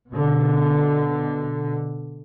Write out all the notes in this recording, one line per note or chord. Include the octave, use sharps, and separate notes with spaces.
B2 D3